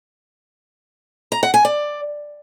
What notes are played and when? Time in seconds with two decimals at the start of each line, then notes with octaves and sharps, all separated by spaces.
1.32 A#5
1.43 F#5
1.54 G#5
1.65 D5